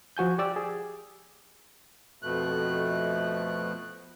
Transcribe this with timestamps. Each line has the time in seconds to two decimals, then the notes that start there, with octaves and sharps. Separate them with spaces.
0.17 F3 F#4 G#5 G6
0.38 G4 D5 E6
0.56 G#4
2.23 F2 B2 A3 F#6